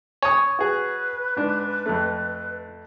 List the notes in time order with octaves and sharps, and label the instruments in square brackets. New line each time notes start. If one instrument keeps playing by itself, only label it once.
[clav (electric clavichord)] C#5 [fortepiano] G#5 D#6
[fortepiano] F#4 G#4 [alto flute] B4
[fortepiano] G#2 D4
F2 A3